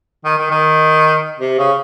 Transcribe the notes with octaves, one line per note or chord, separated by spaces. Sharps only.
D#3
D#3
D#3
C3
C#3